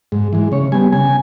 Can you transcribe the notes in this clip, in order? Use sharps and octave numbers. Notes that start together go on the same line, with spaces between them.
G#2
E3 G#3
C#3 C#5
G3 B3 G#5
C#3 G#5